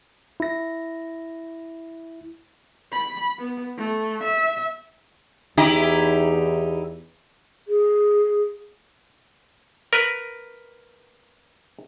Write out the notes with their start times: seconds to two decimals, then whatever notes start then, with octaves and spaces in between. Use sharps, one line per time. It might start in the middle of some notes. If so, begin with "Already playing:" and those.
0.40 E4 A#6
2.92 B5
3.39 B3
3.77 A3
4.24 E5
5.57 E2 D#4 E4 G4
7.68 G#4
9.93 A#4 B4